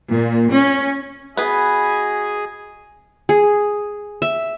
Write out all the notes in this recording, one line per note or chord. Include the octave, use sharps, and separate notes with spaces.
A#2
C#4
B3 F#4 G#4 B4 D#5 G#5
G#4
E5